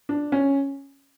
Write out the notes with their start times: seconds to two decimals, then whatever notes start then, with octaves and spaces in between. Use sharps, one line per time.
0.09 D4
0.32 C#4